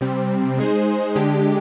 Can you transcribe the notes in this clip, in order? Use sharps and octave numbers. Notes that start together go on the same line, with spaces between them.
C3 G3 C4
G#3 D#4 G#4 C5
D3 G#3 D4 G4